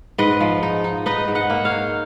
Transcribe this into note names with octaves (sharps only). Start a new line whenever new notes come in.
G#2 B4 D#5
F3
D#4
D#4
D#4 B4 D#5
G#2
D#5 F#5
A#3
C#5 F5
D#4